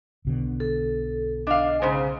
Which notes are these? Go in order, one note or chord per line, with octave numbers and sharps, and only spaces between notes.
B1 B2 D3
A4
D4 D#5 F5
G#2 C#3 C5